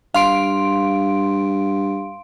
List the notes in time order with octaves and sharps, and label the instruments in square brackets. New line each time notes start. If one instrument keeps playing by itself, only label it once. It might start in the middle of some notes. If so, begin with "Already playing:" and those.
[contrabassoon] G2 [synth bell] F5 C6 D7